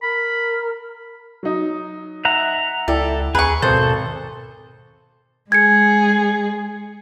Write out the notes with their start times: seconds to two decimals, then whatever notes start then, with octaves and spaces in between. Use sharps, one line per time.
0.03 A#4 B5
1.43 F#3 D#4
2.25 E5 F#5 A#5
2.88 C#2 E4 A4 D5 G5
3.35 D#2 G#4 B4 A#5 C#6
3.62 G#1 B2 A4 C5
5.52 G#3 G#4 G#6 C#7